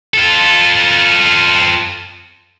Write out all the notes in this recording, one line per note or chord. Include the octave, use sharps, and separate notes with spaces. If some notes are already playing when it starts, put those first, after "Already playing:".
F4 A4